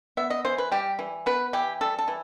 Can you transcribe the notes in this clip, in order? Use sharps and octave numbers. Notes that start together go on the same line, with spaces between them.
B3 E5
D#5
E3 C5
B4
G3 G4
E3
B3 B4
E3 G4
G3 A4
A4
E3